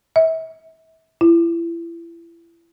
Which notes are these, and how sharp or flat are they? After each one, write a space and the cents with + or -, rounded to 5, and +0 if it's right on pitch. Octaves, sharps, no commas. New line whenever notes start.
E5 -35
E4 +30